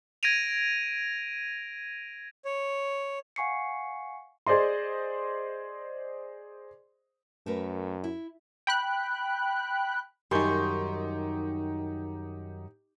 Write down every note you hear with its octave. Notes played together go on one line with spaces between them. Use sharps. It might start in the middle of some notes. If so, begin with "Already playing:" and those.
G#6 A#6 D7 D#7 F7
C#5
F5 F#5 G#5 C#6 C7 C#7
G#4 C5 D5 D#5 C6
F#2 A3 A#4 B4
E4
G5 B5 F#6
F#2 D#3 G3 D#4 G4 C6 C#6 G6